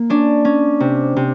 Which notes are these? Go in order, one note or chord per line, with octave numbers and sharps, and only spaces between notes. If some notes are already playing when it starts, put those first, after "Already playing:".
Already playing: A#3
C#4 D4
C#4
C3
C3